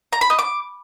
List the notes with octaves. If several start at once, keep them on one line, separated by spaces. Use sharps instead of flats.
A#5
B5
D#5
D6